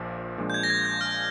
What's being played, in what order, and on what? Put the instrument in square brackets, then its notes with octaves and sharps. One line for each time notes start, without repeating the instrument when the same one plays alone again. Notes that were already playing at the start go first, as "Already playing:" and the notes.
Already playing: [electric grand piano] A#1 A#2 F3
A#2 F3 G#3 D4
[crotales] G6
G#6
A#6
G#6
G6
F6